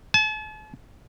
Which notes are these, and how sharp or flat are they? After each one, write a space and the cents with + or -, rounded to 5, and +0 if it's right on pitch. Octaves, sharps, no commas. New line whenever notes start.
A5 -45